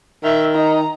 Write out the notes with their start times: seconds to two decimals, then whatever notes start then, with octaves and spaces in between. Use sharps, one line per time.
0.24 D#3 E5
0.55 D#4 A#5